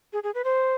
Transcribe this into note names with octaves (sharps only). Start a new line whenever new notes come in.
G#4
G#4
B4
C5